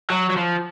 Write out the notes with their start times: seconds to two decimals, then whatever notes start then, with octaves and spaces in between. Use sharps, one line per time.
0.10 F#3
0.30 F#3
0.36 F3